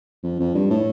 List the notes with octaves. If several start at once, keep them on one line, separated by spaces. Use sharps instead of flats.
F2
F2
G2
A2